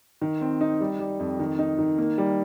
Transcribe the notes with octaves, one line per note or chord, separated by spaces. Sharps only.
D#3
C4
D#4
G3
G3
F2
D#3
D#4
D#3
A#3
G3